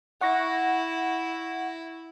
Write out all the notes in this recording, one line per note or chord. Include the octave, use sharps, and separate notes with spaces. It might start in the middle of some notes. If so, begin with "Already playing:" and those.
E4 F#5 C#6 A#6